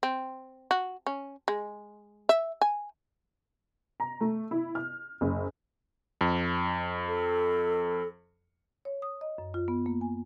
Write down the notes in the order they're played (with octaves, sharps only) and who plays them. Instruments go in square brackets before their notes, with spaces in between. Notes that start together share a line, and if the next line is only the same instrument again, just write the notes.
[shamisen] C4
F#4
C#4
G#3
E5
G#5
[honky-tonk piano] A#5
A3
E4
F6
F#1
[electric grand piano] F2
[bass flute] A4
[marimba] C#5
D#6
D#5
F#2
F4
B3
A#3
G#5